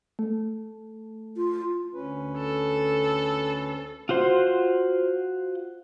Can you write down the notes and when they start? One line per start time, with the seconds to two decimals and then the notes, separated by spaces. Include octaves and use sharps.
0.19 A3
1.36 F4
1.94 D2 C#4 B4
2.38 A4
4.09 F4 F#4 C5 C6